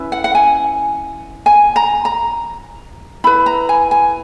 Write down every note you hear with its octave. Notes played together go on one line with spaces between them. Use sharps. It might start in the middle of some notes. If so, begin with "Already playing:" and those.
Already playing: C#4 E4 B4
F#5
F#5
G#5
G#5
A#5
A#5
E4 B4 B5
A#5
G#5
G#5